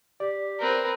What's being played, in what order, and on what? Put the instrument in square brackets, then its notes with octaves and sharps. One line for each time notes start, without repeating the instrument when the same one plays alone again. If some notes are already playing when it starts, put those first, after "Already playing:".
[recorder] G4 [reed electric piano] D5
[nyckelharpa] C4 B4 [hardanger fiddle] A#4